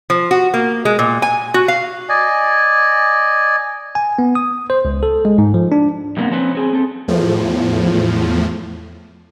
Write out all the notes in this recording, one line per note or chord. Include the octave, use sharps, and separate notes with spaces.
F3
F#4
A#3
G#3
A#2
G#5
F#4
F5
D5 D#5 G#5
G#5
B3
D#6
C5
C#2
A4
G#3
G#2
F3
D4
F#2 C3 A#3 B3
F3 C4 C#4 B4
C4 G#4 G#5
C4 A4
E2 A2 F3